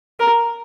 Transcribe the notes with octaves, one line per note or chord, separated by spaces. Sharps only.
A#4